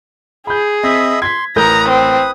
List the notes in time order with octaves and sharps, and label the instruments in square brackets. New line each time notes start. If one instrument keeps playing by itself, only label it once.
[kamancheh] G#4 [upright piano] B5 G6
[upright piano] C4 [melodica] D#5 E5 B5
[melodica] C6 [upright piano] G#6 B6
[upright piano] A1 A#4 G6 [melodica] B4 D#6 [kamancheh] A#5
[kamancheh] C4